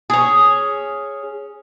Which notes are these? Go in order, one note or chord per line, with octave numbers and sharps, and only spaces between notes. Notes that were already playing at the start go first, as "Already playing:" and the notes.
C#4 G#4